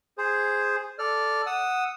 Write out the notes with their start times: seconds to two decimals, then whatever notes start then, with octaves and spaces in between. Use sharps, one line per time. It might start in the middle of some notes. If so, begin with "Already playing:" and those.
0.18 G#4 C5
0.99 A4 D5 F6
1.46 F#5 D#6 E6